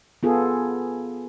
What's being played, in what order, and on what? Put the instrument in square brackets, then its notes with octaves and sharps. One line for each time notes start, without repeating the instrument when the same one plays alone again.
[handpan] B3 F4 G#4 A4